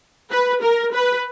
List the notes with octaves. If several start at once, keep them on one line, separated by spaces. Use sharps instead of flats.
B4
A#4
B4